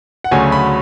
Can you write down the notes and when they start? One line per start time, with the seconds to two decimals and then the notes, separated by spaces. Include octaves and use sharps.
0.24 F#5
0.31 D2 C#3 F#3 A3 C#4 G#5
0.52 B5